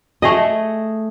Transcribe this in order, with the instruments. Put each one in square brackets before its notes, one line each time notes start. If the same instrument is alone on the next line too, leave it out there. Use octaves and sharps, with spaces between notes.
[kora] A3 G#4 D#5